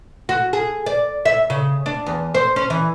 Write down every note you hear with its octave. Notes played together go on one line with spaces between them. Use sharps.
F#4
G#4
D5
E5
C#3
D4
E2
C5
C#4
E3